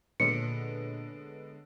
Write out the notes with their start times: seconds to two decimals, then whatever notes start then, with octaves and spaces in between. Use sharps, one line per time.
0.20 A#2 D3 G#3 B3 B4 C#5 C#7 D7